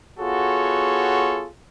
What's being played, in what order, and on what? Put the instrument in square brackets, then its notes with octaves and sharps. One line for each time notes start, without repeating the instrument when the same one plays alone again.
[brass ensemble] B3 F4 F#4 G#4 A4 C#5